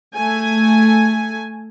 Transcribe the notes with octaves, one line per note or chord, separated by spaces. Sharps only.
A3 G#5